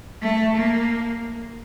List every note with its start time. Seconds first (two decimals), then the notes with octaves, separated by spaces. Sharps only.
0.22 A3
0.55 A#3